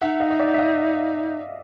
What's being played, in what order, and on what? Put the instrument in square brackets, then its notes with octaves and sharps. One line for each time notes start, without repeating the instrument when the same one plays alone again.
[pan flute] D#4 [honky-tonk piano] E5 F#5
[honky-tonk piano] D#5 F5
D#5
D5 E5
E5
D#5 F5